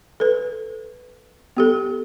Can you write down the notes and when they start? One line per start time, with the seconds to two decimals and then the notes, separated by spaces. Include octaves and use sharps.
0.20 A4 B4
1.57 B3 G4 A4